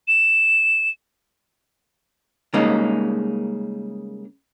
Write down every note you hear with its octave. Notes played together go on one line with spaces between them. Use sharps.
E7
C#3 G3 G#3 A#3 D#4